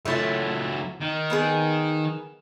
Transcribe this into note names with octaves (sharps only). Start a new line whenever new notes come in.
C#2 F#3 A3 E4 F4
D#3
A#3 B3 G#4